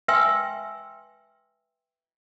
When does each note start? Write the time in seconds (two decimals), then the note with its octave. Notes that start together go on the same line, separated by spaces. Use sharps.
0.08 B4 E5 G5 G#5 C6 E6